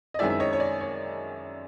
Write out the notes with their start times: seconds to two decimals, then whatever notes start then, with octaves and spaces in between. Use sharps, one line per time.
0.14 D#5
0.19 F#2 D#3 G#3 C4 E4 D5 E5
0.30 E5
0.40 C#5 D#5
0.53 C#5
0.60 D5
0.81 C#5